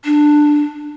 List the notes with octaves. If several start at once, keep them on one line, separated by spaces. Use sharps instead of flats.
D4